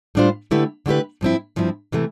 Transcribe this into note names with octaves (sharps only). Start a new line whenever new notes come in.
A2 G3 D4 F4 C5
D3 A3 E4 G4 B4
D3 A3 E4 G4 B4
G2 F3 C4 E4
G2 F3 C4 E4
C3 E3 A3